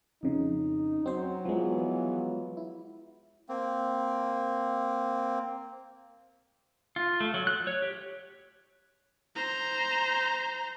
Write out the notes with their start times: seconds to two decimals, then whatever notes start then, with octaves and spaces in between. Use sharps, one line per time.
0.23 F2 C#3 D#4
1.06 F#3 C4 C5
1.45 E3 F3 G#3 B3 F4
2.57 E4
3.49 A#3 C4
6.96 F4
7.20 A3
7.34 F#3
7.47 F#6
7.67 C#5
7.82 G4
9.36 C5 A#5